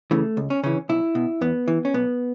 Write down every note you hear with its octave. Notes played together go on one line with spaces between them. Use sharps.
C#3 E3 A3
C#2
C#4
C#3 E3 C#4
B1 E4
B2
E2 B3
E3
C#4
B1 B3